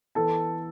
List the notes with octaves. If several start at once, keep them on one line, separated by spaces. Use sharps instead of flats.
E3 B3 A4 A5